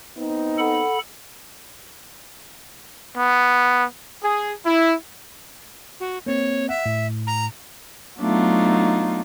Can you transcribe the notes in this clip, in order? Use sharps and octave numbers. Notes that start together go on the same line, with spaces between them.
B3 C4 D#4
A4 F#5 B5
B3
G#4
E4
F#4
A#3 C4 C#5
E5 F#5
A2
A#5
F#3 A3 B3 D4 D#4 F4